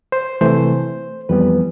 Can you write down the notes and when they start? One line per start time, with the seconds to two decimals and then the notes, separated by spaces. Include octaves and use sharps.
0.12 C5
0.41 C3 E3 A3 C5
1.29 F2 E3 G3 B3 B4